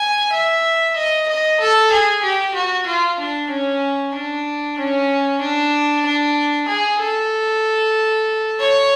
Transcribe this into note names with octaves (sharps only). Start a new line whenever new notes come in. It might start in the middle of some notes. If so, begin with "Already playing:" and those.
Already playing: G#5
E5
D#5
D#5
A4
G#4
G4
F#4
F4
D4
C#4
D4
C#4
D4
D4
G#4
A4
C#5